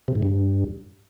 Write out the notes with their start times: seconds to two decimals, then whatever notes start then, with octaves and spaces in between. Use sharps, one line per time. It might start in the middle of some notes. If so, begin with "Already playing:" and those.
0.08 C3
0.15 G#2
0.23 G2